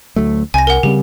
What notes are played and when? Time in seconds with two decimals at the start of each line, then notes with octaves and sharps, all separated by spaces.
0.16 D2 F#3 A3
0.54 C2 G#5 A#6
0.67 A#4 F#5
0.83 C#3 G3 C4 G4